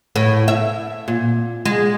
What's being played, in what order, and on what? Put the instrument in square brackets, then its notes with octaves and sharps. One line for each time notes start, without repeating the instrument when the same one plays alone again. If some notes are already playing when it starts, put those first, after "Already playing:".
[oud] A2
E5
A#2
G#3